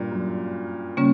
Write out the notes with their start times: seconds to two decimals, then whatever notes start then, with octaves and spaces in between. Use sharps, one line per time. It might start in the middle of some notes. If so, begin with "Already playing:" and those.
Already playing: G2 A#2
0.11 F#2
0.97 C#3 G3 A#3 C#4